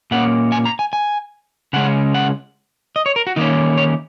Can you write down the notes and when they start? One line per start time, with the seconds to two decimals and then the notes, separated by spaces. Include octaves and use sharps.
0.11 A#2 A#3 C#4 F#5
0.52 G#5
0.66 A#5
0.79 G#5
0.93 G#5
1.73 C#3 G#3 C#4 F#5
2.14 F#5
2.96 D#5
3.06 C#5
3.16 A#4
3.27 F#4
3.36 D#3 A#3 C#4 D#4
3.78 C#5